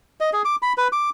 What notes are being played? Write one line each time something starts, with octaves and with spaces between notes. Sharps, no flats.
D#5
G#4
D6
B5
B4
D6